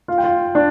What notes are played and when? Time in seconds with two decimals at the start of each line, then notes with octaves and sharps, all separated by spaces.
0.08 F4 F5
0.18 G5
0.24 F4 F5
0.55 D4 D5